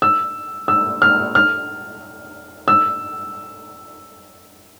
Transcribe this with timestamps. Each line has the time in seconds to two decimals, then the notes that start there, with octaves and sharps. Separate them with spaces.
0.02 E6
0.68 E6
1.02 F6
1.35 F6
2.68 E6